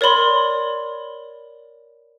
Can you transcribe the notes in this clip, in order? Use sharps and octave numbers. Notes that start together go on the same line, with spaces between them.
A#4 C#5 D5 B5 C6